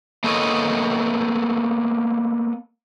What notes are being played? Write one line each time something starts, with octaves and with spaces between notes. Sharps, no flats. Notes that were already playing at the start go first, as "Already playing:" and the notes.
A#3 B3 A4 C#5 D#5